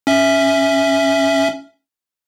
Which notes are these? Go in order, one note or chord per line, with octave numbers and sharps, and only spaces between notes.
C#4 E5